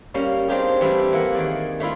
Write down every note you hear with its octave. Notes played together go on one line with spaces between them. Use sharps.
G3 A#3 C#4 F5
C4 D4 D#4 F4 G4 G#4
E3 G3 A3 D4 E4
E3 A#3 A#4 F#5
D#3 G#4 D5
A3 D4 E4 F4